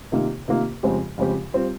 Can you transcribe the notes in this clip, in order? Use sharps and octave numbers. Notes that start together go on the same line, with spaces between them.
C3 D#3 A#3 F4
C3 D#3 A#3 F4
F2 C#3 G#3 C4 G4
F2 C#3 G#3 C4 G4
G3 C4 F4